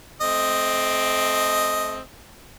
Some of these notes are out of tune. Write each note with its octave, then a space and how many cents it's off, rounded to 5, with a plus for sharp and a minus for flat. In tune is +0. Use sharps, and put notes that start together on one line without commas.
A3 -35 C4 +0 D#5 +0